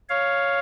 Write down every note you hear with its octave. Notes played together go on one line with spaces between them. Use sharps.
C#5 F5